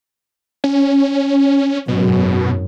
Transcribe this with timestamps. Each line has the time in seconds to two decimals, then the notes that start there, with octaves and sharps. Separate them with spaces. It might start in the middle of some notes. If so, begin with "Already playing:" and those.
0.64 C#4
1.88 G#1 F#2 B2